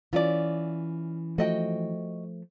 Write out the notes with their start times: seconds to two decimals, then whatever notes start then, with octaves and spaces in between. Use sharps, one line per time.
0.13 E3 C#4 F4 D5
1.38 F3 A3 F#4 D#5 G5